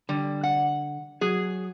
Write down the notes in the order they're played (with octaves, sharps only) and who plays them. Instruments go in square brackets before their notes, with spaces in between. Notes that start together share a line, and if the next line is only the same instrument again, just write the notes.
[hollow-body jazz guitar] D3 [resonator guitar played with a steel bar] G3
[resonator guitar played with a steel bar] F#5
[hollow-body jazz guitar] F#3 [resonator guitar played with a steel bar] G#4